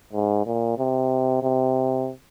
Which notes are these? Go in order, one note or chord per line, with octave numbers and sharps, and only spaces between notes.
G#2
A#2
C3
C3